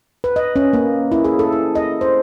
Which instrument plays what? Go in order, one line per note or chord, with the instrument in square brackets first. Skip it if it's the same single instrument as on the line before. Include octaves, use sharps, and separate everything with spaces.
[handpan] B4
D#5
C#4
A#3
E4
G#4
A4
E4
D#5
C5